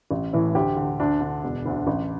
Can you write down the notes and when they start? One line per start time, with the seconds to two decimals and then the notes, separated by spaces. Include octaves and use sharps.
0.11 A1
0.33 A2 E3
0.55 D2 G4
0.77 D3
1.00 D2 D4
1.21 D3
1.44 E1
1.66 D2 D3
1.87 A1